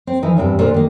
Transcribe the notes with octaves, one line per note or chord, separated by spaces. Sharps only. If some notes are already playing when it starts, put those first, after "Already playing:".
C4
E3 F3 D#4
E2 G2 C3 G5
A#2 D3 D4 C5 D5
D#3 A#3